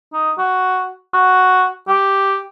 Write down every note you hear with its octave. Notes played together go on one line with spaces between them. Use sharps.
D#4
F#4
F#4
G4